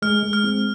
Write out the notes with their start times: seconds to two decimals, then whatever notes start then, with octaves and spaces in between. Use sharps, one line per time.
0.02 G#3 F6
0.23 G#3
0.33 F6
0.44 C4